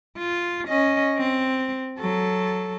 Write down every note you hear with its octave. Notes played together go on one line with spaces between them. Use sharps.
F4
C#4 D#5
C4
F#3 A4